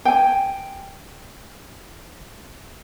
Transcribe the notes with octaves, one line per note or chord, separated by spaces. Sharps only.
G5 G#5